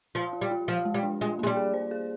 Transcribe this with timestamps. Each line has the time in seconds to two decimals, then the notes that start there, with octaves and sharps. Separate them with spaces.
0.15 F3 F4
0.33 F4
0.41 G3
0.51 F4
0.68 F3 F4
0.85 G#3
0.94 G3
1.03 D4
1.21 G#3 F4
1.39 G#3 A#3
1.47 G3
1.57 G#4
1.74 C5
1.91 G#4